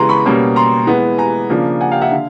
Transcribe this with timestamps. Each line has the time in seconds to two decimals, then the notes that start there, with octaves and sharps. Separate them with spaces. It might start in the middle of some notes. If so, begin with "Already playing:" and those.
Already playing: C#3 E3 G#3 B3 A#5 C6
0.09 B5 C#6
0.26 B2 G3 A#3 C#4
0.56 A#5 C6
0.87 E3 G#3 B3
1.18 G#5 A#5
1.50 C#3 F3 A#3 D4
1.81 F#5 G#5
1.92 F5 G5
2.01 E5 F#5
2.12 D3 F5